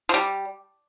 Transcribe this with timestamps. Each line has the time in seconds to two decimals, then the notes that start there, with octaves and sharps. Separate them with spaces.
0.09 F3
0.14 G3